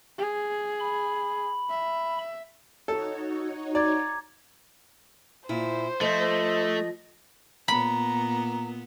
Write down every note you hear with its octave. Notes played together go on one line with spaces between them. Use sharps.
G#4
B5
E5
D#4 F#4 A4 C#5
D5 A#5 D6 G#6
A#2 E4 C5
F3 A3 D#5
A#2 B3 A#5 B5